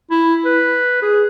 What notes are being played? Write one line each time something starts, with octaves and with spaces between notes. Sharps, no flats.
E4
B4
G#4